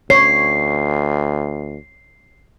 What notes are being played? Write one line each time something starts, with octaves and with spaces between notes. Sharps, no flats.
D2 C#5 C7